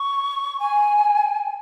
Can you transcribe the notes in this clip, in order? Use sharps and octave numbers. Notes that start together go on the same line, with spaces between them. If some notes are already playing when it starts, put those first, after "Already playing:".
Already playing: C#6
G#5